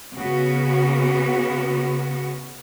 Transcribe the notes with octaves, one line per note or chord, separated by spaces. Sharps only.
C#3 B3 F#4